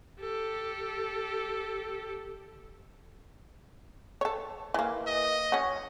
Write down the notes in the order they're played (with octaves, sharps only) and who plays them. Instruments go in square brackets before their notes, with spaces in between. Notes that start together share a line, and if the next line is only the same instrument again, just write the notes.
[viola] G4 A4
[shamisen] A4 C#5
E3 A#3
[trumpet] D#5
[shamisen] C#4 F#4